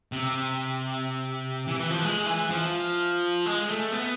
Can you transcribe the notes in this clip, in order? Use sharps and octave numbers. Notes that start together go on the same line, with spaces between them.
C3
E3
E3
F3
G#3
E3
F3
G#3
A3
B3